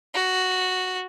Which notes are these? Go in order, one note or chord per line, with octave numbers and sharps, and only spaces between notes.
F#4